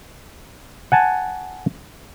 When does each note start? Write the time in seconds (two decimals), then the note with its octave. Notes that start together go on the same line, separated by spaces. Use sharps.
0.92 F#5 G#5 A5